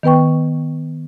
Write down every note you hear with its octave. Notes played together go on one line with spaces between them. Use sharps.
D#3 B3 B4 G5 C#6